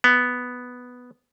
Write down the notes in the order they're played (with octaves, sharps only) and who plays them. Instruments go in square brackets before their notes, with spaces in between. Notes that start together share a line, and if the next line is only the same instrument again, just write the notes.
[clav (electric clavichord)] B3